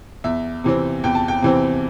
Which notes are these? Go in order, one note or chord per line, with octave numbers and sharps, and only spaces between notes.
E2 E5
C3 E3 C4
E2 G5
A5
G5
C3 E3 C4